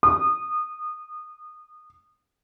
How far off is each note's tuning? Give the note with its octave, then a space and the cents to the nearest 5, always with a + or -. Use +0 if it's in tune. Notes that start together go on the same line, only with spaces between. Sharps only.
D#6 -25